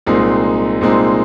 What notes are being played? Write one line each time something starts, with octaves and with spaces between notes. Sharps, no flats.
C2 A#2 G#3 C4 D#4
C2 A#2 G#3 C4 D#4